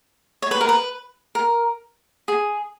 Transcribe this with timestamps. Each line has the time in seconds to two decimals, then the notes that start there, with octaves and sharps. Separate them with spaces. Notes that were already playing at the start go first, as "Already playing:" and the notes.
0.42 C#5
0.51 B4
0.61 A#4
0.69 B4
1.35 A#4
2.28 G#4